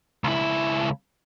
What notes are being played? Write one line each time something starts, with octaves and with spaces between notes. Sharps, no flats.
C#2 E4